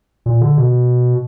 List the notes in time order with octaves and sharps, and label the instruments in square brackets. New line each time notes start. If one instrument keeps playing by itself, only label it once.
[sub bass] A#2
D3
B2